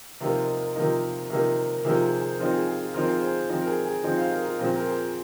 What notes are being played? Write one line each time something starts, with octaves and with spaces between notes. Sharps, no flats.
C3 F3 A#3 D#4 F4 A#4
A#4 D#5
A#4 D#5
C3 F3 A#3 D#4 A#4 D#5
C3 F3 A#3 D#4
A#4
C3 F3 A#3 D#4 G#4 C5
G#4
G#4 C5
F3 C4 D#4 F4 A#4
G#4
G#4
F4
F3 C4 D#4 F4 A#4
G#4 C5
G#4 C5
F3 C4 D#4
A#4
G#4
G#4
F3 C4 D#4
C5 F5
A#4 D#5
F4 A#4
A#2 F3 C4 F4 G#4 C5
A#4
G#4 C5